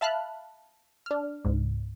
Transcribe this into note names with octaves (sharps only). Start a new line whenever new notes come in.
E5 F5 A5 B5 F6 F#6
D4 F6
C#2 G#2